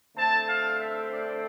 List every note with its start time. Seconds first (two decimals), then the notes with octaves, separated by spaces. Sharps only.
0.17 D3 A3 C4 A5
0.49 F5
0.80 E5
1.12 D5